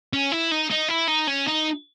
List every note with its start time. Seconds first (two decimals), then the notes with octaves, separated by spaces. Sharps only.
0.13 C#4
0.32 E4
0.52 D#4
0.71 D#4
0.89 E4
1.08 D#4
1.28 C#4
1.47 D#4